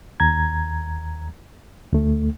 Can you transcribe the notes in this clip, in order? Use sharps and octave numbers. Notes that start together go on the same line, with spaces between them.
D#2 A#5 G#6
D2 A3